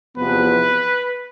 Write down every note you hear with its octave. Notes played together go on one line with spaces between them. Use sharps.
E2 C3 F3 B3 B4